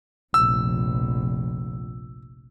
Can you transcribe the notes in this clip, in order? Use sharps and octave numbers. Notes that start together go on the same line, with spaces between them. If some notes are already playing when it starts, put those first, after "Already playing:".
F1 A#1 E6